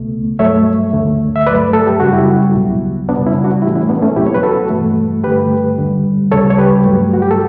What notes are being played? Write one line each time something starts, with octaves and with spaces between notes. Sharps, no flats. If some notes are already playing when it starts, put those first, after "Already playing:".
Already playing: C#2 B2 A3
G2 F#3 A3 C#5 E5
D2 D3 A3
E5
G2 F#3 A3 B4 D5
A4
G4
F#2 C#3 G3 F#4
E4 G4
C#2 B2 F#3
F#2 C#3 G3 B3 D4
C#4 E4
D4 F#4
A2 E3 A3 E4 G4
C#4 E4
B3 D4
A3 C#4
E2 B2 F#3 E4 G4
C#5
B4
F#4 A4
G2 E3 A3
G2 D3 A3 G4 B4
E2 D3 G3
D2 C#3 G3 A4 C#5
C#5
G4 B4
G2 F#3 A3
F#4
G4
A4